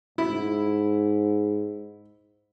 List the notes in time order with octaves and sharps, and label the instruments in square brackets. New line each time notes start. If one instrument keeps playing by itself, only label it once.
[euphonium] G#2 [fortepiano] E4